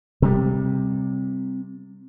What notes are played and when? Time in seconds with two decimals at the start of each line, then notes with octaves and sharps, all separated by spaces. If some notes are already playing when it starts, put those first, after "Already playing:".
0.22 C3 G3